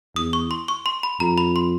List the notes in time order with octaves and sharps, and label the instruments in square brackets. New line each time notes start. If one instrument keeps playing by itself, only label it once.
[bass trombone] E2 [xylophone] D#6
[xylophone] C#6
C6
C#6
C6
B5
[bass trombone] F2 [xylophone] A#5
[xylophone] B5
C6